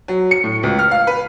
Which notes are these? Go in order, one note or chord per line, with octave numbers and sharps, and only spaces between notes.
F#3
C#7
A2
C#2
F6
F5
B4